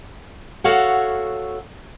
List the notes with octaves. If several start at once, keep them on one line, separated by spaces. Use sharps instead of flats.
F#4 A4 C#5 F5 F#5